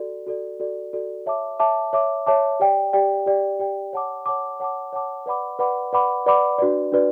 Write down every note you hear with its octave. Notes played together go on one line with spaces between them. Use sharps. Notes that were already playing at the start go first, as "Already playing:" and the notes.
Already playing: F#4 A4 D5
F#4 A4 D5
F#4 A4 D5
F#4 A4 D5
C#5 E5 A5 D6
C#5 E5 A5 D6
C#5 E5 A5 D6
C#5 E5 A5 D6
G4 D5 G5
G4 D5 G5
G4 D5 G5
G4 D5 G5
C#5 F#5 A5 D6
C#5 F#5 A5 D6
C#5 F#5 A5 D6
C#5 F#5 A5 D6
B4 D5 F#5 B5 D6
B4 D5 F#5 B5 D6
B4 D5 F#5 B5 D6
B4 D5 F#5 B5 D6
D4 F#4 B4 D5
D4 F#4 B4 D5